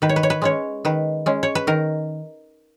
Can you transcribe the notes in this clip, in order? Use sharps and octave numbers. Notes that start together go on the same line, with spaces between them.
D#3 B4
C#5
B4
C#5
B4
G#3 C#4 C#5
D#3 B4
G#3 C#4
C#5
B4
D#3 A#4